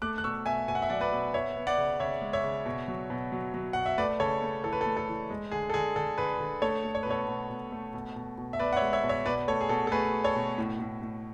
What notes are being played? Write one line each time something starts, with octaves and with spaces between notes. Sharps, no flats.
A3 D6 F#6
F#6
B2 C#6 E6
B2 E5 G#5
B2 G#5
F#5
E5
F#3 D5 F#5
B4 D5
B2
B3 C#5 E5
B3
D5 F#5
C#3
C#3 C#5 E5
G#3
C#5 E5
C#3
B2
F#3
B2
F#3
F#3
B2 F#5
E5
A3 B4 D5
C#3 A4 C#5
A3
E3 A4
B4
A4
A3
A4
E3
G#3
D3 G#4
A4
D3 G#4
D3 A4
D3 G#4 B4
D3
A3 A4 C#5
A3
C#5
B4
B2 A4 C#5
B2
B2
A3
B2
B2
B2
E5
B3 B4 D5
F#5
C#5 E5
G#3
C#5 E5
B2
C#5 E5
B2 B4 D5
A3 A4 C#5
G#4
B2 A4
A4
A3 G#4 B4
A3
A4 C#5
B2
A2
A2
A2